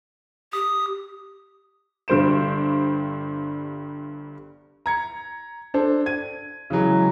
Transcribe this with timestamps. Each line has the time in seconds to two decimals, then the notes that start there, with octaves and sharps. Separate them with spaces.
0.53 G4 D#6
2.08 G1 G2 G3 C5 D7 E7
4.86 A#5 G#6 C#7
5.74 D4 A4 C5
6.06 G#6 D#7
6.70 C#3 E3 F#3 G#3